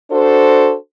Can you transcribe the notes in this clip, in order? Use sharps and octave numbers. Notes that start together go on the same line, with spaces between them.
D4 F#4 A4 C5